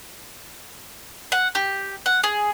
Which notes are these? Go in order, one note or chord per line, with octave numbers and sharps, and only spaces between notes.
F#5
G4
F#5
G#4